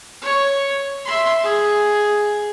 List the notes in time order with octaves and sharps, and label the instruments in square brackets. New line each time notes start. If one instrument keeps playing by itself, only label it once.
[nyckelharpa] C#5
E5 C6
G#4